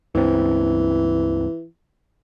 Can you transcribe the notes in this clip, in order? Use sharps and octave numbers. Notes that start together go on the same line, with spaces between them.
C#2 G2 E3 C4